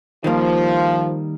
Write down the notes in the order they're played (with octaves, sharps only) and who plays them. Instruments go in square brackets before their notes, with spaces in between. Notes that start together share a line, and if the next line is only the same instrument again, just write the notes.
[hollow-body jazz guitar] D#3 G3 A#3 [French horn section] F3